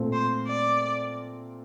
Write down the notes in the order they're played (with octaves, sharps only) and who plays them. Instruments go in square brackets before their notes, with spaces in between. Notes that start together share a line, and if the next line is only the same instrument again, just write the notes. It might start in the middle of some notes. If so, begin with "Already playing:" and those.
Already playing: [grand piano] A#2 A3 C4
[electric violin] C5
D5